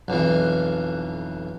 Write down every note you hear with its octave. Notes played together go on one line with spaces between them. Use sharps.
B1 F2 E3